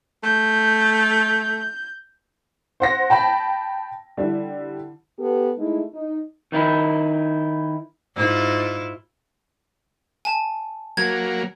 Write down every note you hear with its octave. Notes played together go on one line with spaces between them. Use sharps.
A3 G6
C5 F#5 A#6
G5 A5 B5
D3 G3 E4
B3 G4 A4
G#3 A3 D#4 E4
D#4
D#3 D#4 E4
G#2 E4 F4
G#5 A5
F#3 A#3 G#6